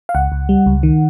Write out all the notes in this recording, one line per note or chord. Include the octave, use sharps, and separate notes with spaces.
F5
C#2 F#5
C#2
G3
C#2
D#3